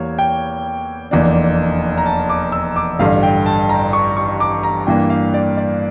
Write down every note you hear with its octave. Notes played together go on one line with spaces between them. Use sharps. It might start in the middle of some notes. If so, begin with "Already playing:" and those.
Already playing: E2 E3 G3 A#3 C#5
G5
F1 E2 E3 A#3 D4
A#5
A5
D6
E6
D6
A1 G2 D3 F5
G5
A5
A#5
C#6
C#6
D6
A#5
G2 E3 A#3 D4 G5
F5
D5
D5